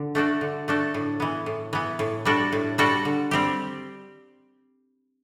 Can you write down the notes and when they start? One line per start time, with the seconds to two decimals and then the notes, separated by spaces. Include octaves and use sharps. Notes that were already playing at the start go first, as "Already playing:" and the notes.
Already playing: D3
0.15 A3 D4 F#4 A4
0.41 D3
0.68 A3 D4 F#4 A4
0.94 A2
1.20 E3 B3
1.46 A2
1.73 E3 B3
1.99 A2
2.25 G3 D4 F#4 A4
2.53 A2
2.78 G3 D4 F#4 A4
3.05 D3
3.31 G3 C4 G4